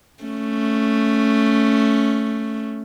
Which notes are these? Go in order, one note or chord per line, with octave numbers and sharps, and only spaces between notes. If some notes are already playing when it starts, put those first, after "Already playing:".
A3 C#4